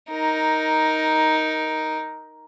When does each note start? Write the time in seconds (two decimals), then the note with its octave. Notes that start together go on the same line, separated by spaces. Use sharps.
0.11 D#4 A#4